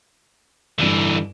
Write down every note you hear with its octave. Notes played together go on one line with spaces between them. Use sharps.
G2 D3 E3 D5 E7